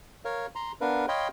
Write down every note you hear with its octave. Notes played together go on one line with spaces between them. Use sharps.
A#4 C#5 F5
A#5 C6
B3 D4 A#4 B4 F5
C#5 D#5 F5 G5 B5 C6